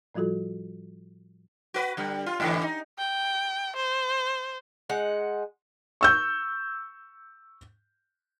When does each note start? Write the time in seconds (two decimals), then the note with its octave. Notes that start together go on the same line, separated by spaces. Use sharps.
0.15 A2 F3 G3 F4 F#4 A4
1.74 F#4 B4
1.97 D3 G3
2.26 F4
2.40 G#2 D3 E3
2.62 D#4
2.98 G5
3.76 C5
4.90 G#3 D#4 F#5
6.01 C#6 E6 G6